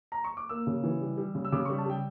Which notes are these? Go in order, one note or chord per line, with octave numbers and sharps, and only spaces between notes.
A#5
C#6
D6
A#3 E6
C#3
E3
G3
G3
C#3
E6
C#3 D6
G3 C#6
A5
G3 G5